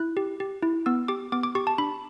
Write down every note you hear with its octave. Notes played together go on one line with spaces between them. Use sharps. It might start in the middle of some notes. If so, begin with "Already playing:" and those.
Already playing: E4 F#6
G4
G4
E4
B3 E6
G4 D6
B3 D6
D6
G4 C#6
A5
D4 B5